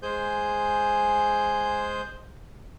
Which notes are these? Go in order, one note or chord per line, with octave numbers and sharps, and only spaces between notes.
G#3 G#4 C5 G#5 G6